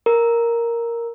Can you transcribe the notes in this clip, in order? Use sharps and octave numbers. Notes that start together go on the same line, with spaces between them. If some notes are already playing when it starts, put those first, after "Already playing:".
A#4